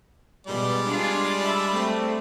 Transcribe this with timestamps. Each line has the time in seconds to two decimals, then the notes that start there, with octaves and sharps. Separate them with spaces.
0.47 B2 G3 G#3 D5
0.88 D4 F4 G#4
1.42 E5 A5 B5
1.71 A3 C4